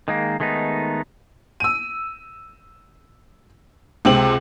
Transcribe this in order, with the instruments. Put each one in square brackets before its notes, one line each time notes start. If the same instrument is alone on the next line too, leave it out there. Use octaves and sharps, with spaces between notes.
[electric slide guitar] D#3 G#3 A#3
D#3 G#3 A3 B3 D#4
[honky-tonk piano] E6 D#7
C#2 C3 C4 F#7